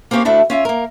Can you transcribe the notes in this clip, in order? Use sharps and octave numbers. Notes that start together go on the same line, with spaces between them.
A#3 C4 C#4 G4 C#5 F5
D2 A3 D4 E4 A5
C#4 F4 E5
A#3 A#4